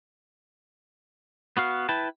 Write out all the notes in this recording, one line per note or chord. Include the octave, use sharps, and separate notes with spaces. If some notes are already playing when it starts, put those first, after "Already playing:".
B3 F#4 F5
E4 B4 G5 A5